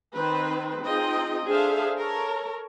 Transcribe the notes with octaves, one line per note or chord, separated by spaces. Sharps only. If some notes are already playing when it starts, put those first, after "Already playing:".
D#3 C4 B4 C5
C4 D#4 F4 G#4 D#5 G5
D4 G#4 A4 C5 E5 F5
A4 A#4 C#5